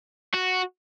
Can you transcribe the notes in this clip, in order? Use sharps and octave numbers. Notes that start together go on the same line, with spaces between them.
F#4